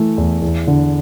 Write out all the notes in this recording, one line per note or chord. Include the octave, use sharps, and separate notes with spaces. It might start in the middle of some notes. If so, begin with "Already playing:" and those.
Already playing: E3 A3
E2
E2
D3